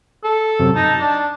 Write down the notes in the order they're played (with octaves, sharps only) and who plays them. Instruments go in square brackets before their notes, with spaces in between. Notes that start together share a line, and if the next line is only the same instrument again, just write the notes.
[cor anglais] A4
[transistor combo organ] F#2 C3
[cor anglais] D#4 [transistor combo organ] A5
[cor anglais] D4